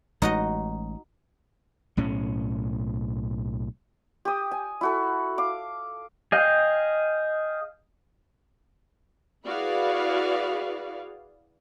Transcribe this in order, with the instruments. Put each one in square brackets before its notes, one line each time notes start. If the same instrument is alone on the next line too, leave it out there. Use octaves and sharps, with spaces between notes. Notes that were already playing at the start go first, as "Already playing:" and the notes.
[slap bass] A1 G#3 [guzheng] D#4 F#4 D#5
[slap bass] B1 A2 C#4
[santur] G4 D#6
G#5
E4 F#4 A4
F5 D6
[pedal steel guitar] G#4 D#5 F5 G5
[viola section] E4 F#4 G#4 B4 D5 F5